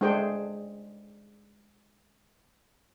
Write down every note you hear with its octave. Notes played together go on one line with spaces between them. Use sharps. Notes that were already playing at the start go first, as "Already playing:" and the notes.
G#3 A3 D4 G#4 C5 G5